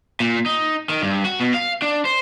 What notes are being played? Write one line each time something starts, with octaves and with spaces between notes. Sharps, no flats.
A#2
D#4
D#3
G2
F#4
B2
F5
D4
C5